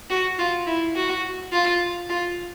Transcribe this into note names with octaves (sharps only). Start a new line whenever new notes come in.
F#4
F4
E4
F#4
F4
F4